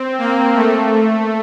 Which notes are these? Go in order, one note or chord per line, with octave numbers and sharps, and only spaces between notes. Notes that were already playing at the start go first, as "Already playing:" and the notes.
Already playing: C4
A#3
A3